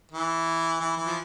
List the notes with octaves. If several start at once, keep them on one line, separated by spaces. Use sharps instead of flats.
E3
E3
E3
F3